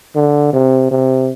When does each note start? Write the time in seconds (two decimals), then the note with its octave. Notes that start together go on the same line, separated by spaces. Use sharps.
0.15 D3
0.53 C3
0.91 C3